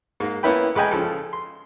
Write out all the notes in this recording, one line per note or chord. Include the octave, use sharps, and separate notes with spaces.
G#2 A#3
A#3 B3 C#4 E4 B4 G5
A1 G#3 B4 D#5 G5 G#5
C#3 F3 A4
C6